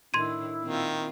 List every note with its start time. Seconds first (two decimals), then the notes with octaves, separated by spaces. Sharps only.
0.14 A2 D#3 D4 E4 C6 G#6 D#7
0.62 A#2 D#3 C4 F4